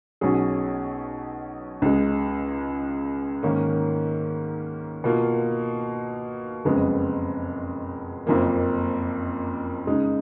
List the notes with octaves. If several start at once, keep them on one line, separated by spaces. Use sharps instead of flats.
B1 B2 F#3 C#4 G#4
C#2 C#3 G#3
G#2 D#3 A#3 C#4
B2 A#3 F4
F#1 F2 C#3 G#3 B3
F#1 F2 F3 A#3
C#3 G#3 D#4